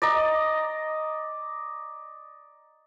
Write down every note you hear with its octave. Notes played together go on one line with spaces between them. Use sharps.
D5 D#5 A#5